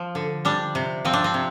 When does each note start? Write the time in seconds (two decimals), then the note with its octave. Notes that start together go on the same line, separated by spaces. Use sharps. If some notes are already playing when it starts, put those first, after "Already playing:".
Already playing: F3
0.15 D3
0.45 G3 D4
0.75 C3
1.05 F3 C4
1.13 D4
1.24 C4
1.34 C3